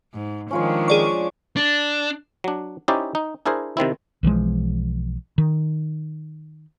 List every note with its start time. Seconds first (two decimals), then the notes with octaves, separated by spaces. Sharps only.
0.14 G#2
0.51 D#3 F3 G#3 C#4 D4 F4 C#5
0.88 G#4 D5 C#6
1.57 D4
2.44 F#3 D4
2.88 C#4 D#4 E4 G4 C5 D5
3.15 D#4
3.46 D4 E4 G#4 A#4 C5
3.77 C3 D#3 C4 E4
4.23 B1 E3 F3 G#3
5.38 D#3